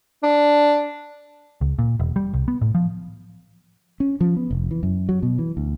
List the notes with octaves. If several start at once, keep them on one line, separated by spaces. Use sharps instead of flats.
D4
C#2
A#2
E1
G3
C2
B3
A2
F3
C#4
F3
B3
F1
E3
F#2
F#3
B2
E3
D2